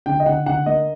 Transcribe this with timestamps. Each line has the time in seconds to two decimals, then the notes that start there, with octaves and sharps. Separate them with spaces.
0.06 D3 G5
0.20 D#5
0.26 D3 F#5
0.46 D3 F#5
0.66 A#3 D#5